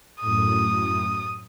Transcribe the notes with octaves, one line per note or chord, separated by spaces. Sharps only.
F#2 A2 D#6